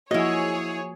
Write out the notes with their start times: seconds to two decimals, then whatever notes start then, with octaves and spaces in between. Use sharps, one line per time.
0.11 F3 A#3 E4 F#4 G#4 C#5 D#5